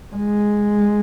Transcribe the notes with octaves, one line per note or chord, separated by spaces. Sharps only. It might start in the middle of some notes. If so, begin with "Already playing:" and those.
G#3